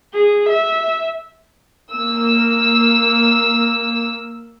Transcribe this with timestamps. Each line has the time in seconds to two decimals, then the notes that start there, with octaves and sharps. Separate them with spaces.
0.14 G#4
0.49 E5
1.93 A#3 E6